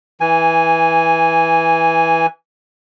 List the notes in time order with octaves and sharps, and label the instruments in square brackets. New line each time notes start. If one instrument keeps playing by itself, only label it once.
[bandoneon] E3 G#5